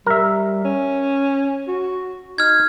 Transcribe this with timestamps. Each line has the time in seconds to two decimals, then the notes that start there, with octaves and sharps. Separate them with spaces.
0.06 G3 A#4 E5
0.64 C#4
1.68 F#4
2.38 D#4 F6 G#6